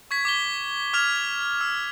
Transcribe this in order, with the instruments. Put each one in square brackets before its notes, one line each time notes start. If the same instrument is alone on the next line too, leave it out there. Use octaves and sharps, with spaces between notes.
[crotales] C#6 G#6 B6
D6 B6 G7
D6 F6 G#6 F7
E6